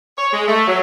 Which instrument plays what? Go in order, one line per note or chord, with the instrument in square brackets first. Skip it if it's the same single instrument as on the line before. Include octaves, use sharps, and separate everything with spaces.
[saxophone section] C#5
G#3
A3
F#3